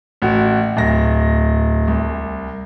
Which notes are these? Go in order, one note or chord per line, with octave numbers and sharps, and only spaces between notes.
A1 F#4
D1 A#6
C2